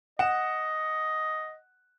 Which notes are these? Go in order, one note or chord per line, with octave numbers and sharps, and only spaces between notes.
D#5 F#5 E7